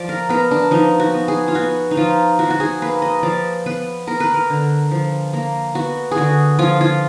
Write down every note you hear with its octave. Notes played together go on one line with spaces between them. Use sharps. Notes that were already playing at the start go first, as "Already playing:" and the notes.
Already playing: F3 D5
A#4
B3 A#4
D4
F3 D#4
F#4
B3
G#4
F4
B3 F#4
D#4
F3 F4
F3 F#4
F#4
G#4
A#3 B4
D#5
F3 D5
B3 B4
B3 A#4
B4
A#4
D3
F3
A#3
B3 F#4
G#4
D3 F#4
F3 F4
F4